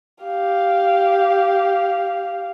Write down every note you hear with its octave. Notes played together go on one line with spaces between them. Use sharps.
G4 F5